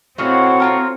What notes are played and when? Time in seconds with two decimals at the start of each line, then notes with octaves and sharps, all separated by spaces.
0.18 A2 C4 F#4 C#5 D#5 F5 F#5
0.60 F4 G4 A#4